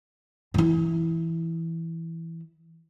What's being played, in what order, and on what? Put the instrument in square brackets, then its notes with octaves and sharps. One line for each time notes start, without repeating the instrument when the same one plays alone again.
[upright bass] E3 E4